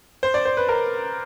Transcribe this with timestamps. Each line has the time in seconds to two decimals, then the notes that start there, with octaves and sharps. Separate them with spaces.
0.23 C5
0.34 D5
0.45 C5
0.57 B4
0.69 A#4